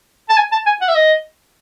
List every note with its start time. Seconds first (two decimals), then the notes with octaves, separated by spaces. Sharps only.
0.29 A5
0.37 G#5
0.52 A5
0.66 G#5
0.81 F#5
0.89 E5
0.95 D#5